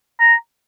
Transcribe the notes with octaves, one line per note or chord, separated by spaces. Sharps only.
A#5